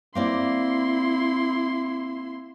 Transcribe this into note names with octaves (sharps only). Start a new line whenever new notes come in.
A#3 C4 E4 D5 C6